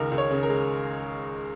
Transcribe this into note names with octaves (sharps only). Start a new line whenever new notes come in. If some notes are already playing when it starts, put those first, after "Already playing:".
Already playing: C#2 D#3 A#4
C#2
C#5
C#3
A#4
G#3